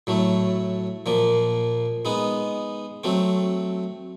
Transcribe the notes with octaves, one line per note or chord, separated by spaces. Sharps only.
A2 F#3 A3
A#2 F3 A#3
G#3 B3 D#4
F#3 A3 C4